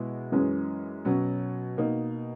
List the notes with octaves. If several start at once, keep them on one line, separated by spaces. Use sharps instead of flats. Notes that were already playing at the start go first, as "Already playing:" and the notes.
Already playing: B2 G#3 B3 E4
F#2 E3 G#3 C#4
B2 F#3 C#4
B2 A#3 D#4